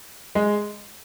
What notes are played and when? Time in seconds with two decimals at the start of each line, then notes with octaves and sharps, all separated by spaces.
0.35 G#3